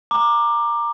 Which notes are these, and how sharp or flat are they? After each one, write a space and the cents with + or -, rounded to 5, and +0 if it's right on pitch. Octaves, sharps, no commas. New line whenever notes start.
A#5 +0 D6 +15